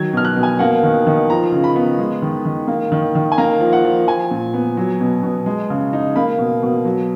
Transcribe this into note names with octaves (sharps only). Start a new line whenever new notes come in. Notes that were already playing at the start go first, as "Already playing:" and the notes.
Already playing: D#3 F#3 G#6
B2 F6
F#6
B2
G#5
A#3 F#5
D#3
D#3
F3 A#5
C#3
B5
B3
G#3
D#3
D#3
A#3
D#3
D#3
G#5
A#3 A#5
F3
F#5
F3
F3 G#5
A#2
B3
F#3
B2
B2
G#3
C#3
D#4
A#3 B5
B2
B2
F#3